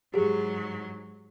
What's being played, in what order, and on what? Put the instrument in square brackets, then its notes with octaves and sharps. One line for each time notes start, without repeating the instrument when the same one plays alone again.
[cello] G#2 F#3 [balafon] G4 G#4